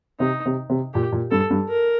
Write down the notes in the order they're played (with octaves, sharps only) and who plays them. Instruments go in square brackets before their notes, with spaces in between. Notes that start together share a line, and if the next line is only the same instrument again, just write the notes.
[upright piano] C3 [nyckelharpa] D#4
[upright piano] C3
C3
[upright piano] A#2 [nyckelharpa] G4
[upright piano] A#2
[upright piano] G2 [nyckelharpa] A4
[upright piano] G2
[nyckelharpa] A#4